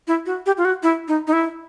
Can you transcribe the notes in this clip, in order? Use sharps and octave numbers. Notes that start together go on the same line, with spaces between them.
E4
F#4
G4
F4
F#4
E4
D#4
D#4
E4